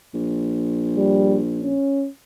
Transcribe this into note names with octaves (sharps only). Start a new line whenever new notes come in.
A#1
G3
C#4